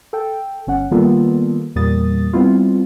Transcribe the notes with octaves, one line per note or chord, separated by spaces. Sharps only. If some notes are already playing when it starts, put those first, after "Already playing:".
A4 G5
G1 C#4 F#5
D#3 G3 A#3 B3 F4 A4
E2 A#2 G3 A#3 D#6 A6
G3 B3 C4 E4 F4